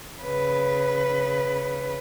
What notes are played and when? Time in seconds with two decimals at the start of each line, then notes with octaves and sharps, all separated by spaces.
0.22 C#3 B4